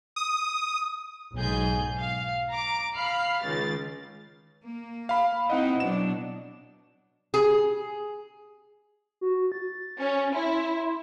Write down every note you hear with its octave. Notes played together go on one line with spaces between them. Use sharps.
D#6
B1 G#2 G#4 G6
F5
A#5 D6
F5 B5 F6 C7
C#2 D#3 A6
A#3
F5 B5
C4 D#4 E4 D#5 F#5
B2 F#3 D4 E7
G#4
F#4
A6
C#4
E4 C6